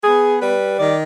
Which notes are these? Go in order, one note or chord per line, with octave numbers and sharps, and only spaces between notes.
B3 G#4
G3 B4
D#3 D5